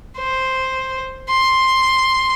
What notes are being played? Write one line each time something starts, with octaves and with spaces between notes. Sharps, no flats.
C5
C6